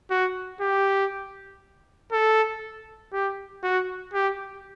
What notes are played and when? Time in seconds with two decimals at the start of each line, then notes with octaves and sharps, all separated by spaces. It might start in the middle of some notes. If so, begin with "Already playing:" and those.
0.11 F#4
0.61 G4
2.12 A4
3.13 G4
3.64 F#4
4.14 G4